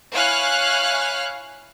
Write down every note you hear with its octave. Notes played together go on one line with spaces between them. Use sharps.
E4 C#5 F5 G#5 F6 F#6